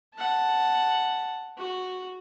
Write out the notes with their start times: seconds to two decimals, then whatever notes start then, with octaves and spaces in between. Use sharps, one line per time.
0.15 F#5 A5
1.57 F#4